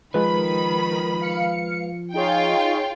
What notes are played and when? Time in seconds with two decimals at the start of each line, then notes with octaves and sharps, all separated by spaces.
0.14 D#3 F3 G#3 B4 B5
1.21 F5 C#7
2.14 D#4 F4 G#4 C#5 G5